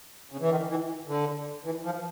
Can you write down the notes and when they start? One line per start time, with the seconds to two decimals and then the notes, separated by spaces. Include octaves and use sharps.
0.31 C#3
0.41 E3
0.50 D#3
0.70 E3
1.08 D3
1.65 E3
1.85 F3